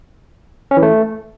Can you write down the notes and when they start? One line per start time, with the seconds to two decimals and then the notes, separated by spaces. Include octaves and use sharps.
0.71 C#4
0.77 E3
0.83 A3